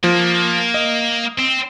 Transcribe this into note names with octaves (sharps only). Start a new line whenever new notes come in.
F3 A#3
D#5
C4